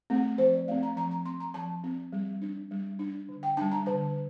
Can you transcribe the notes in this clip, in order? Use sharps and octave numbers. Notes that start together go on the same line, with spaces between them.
A3 C4
F3 C5
D5
A3 C4 F5
A#5
F3 A#5
A#5
C4 C6
A#5
F3 A5
C4
G3
D4
G3
D4
D3
G5
G3 D4 A5
A#5
D3 A5